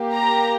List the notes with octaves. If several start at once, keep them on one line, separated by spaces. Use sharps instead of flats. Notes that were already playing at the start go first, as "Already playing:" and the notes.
Already playing: A#3 G4
A#5